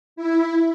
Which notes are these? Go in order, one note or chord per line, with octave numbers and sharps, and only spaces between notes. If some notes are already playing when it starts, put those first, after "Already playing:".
E4